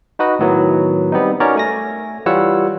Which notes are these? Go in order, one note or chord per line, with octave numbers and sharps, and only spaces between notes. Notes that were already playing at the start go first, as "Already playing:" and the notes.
D#4 F#4 B4 D#5
A2 D#3 F#3 B3 E4
G3 B3 C4 D#4
C#4 D#4 F#4 A#4 C#5 D5
A3 G#5 A#6
E3 G3 F4 C#5 F#5 E6